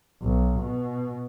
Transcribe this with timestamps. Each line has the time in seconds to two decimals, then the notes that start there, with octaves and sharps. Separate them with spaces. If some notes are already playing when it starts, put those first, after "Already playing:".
0.23 B1
0.60 B2